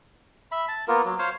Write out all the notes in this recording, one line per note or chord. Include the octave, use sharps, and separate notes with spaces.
E5 B5
A5
A#3 B3 F4 A#4
F#3
C5 C#5 F5